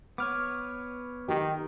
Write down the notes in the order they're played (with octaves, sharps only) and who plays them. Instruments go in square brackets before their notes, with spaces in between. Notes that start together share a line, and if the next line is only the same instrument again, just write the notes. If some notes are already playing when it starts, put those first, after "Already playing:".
[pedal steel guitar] B3 B4 C#5 [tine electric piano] D6 F6
[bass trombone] D#3 [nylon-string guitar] G4